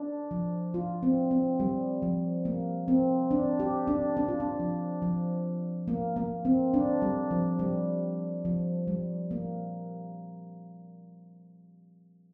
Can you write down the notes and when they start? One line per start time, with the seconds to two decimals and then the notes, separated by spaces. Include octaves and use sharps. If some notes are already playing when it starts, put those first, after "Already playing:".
Already playing: D4
0.31 F3
0.74 F4
1.03 C4
1.31 C4
1.60 G3
2.02 F3
2.45 A#3
2.88 C4
3.31 D4
3.60 G4
3.87 D4
4.17 D4
4.28 F4
4.40 D4
4.60 F3
5.02 F3
5.88 A#3
6.16 A#3
6.45 C4
6.74 D4
7.02 G3
7.31 F3
7.59 G3
8.45 F3
8.88 G3
9.31 A#3